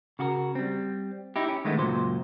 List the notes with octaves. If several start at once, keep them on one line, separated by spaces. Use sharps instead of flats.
C#3 F#4 G4 A#4
G3 C4
D#4 E4 G4
C#4
D#3 G#3 A3 B3 D#4
C#2 F#2 A#2 F#3 C5